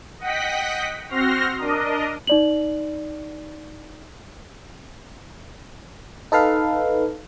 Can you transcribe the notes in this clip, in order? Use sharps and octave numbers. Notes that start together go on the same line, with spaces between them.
D#5 F#5 G5 B6
C4 F#4 C6 F6 A#6
D4 A#4 D#5
D#4 D5 F#7
D#4 A4 B4 F5